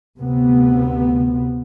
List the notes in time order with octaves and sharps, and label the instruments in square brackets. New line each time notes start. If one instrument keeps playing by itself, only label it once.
[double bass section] D2 C3 B3